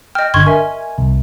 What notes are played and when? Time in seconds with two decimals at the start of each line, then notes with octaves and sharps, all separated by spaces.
0.15 D#5 G5 F6
0.34 G1 D3 C6 C#6 G#6
0.47 A#4 E5 G#5
0.98 C2